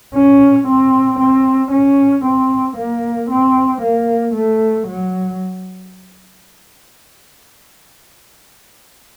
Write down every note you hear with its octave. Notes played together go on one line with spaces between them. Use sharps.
C#4
C4
C4
C#4
C4
A#3
C4
A#3
A3
F#3